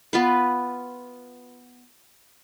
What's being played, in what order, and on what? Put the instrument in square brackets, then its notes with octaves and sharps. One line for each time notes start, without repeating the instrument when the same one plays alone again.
[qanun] B3 F4 B4